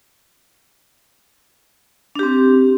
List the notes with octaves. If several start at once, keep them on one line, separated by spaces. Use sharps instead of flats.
C4 D4 G4